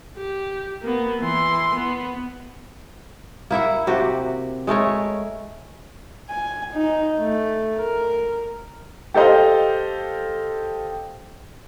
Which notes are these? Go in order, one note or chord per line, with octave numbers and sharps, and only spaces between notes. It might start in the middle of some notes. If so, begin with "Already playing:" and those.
G4
A#3 B3
E3 C6
B3
A#3 E4 E5 F#5
C3 F#4 G4
G#3 A3 A#4 C#5
G#5
D#4
A3
A#4
G4 A4 C5 D#5 F5